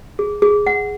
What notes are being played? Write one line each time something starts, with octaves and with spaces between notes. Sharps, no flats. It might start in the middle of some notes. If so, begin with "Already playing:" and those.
G#4
G#4
F#5